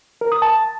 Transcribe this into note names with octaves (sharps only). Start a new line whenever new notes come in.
A#4
D#6
A5